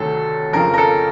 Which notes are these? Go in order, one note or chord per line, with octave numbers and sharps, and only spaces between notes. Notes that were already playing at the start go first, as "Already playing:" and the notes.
Already playing: D2 C3 D#3 F#3 A4
F2 C#3 F3 A#4
A#4
A4